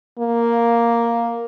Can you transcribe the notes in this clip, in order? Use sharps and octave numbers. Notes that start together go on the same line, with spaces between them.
A#3